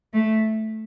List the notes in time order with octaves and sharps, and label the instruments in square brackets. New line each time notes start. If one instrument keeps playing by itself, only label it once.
[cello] A3